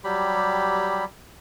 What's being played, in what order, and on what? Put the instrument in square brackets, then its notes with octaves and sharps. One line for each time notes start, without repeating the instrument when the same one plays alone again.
[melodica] F#3 G3 G4 B5